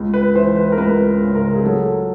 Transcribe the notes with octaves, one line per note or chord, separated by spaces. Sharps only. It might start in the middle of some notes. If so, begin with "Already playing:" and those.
Already playing: C#2
B4
E3 C5
B4
A#4
C#2 B4
C#3
A#4
G#4
F#3 A4